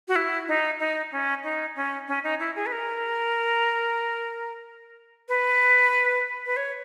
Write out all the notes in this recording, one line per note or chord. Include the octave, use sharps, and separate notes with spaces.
F#4
E4
D#4
D#4
C#4
D#4
C#4
C#4
D#4
E4
G#4
B4
A#4
B4
B4
C#5